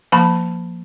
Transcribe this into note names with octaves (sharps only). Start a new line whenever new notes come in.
F3 A#3 A5 B5